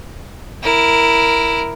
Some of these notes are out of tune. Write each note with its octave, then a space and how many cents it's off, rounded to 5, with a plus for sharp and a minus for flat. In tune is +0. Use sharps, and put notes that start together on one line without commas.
E4 +0 A#4 +0